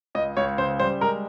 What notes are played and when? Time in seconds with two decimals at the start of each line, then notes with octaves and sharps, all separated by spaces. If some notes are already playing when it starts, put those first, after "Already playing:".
0.15 C#2 D#5
0.37 C#2 C#5
0.58 C#3 C5
0.79 G3 C5
1.00 G#3 A#4